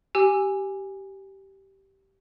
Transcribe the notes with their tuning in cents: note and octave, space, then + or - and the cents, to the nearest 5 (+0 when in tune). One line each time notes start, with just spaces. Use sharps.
G4 -15 G#5 -10 E6 +0